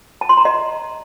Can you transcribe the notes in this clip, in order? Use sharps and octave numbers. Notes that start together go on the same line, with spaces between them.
A5
C6
A#5
D#5